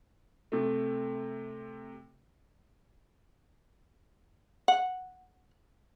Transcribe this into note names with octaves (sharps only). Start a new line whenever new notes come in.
C3 A3
F#5